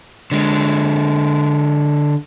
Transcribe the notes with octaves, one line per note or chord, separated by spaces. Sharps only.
D3 G#3